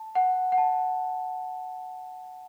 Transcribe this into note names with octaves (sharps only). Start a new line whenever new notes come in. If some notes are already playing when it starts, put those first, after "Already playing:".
Already playing: A5
F#5
F#5
A5